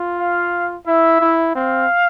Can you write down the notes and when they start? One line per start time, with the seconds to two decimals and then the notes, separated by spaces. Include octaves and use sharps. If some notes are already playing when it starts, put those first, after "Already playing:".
Already playing: F4
0.19 F5
0.87 E4 E5
1.21 E4
1.55 C4 F5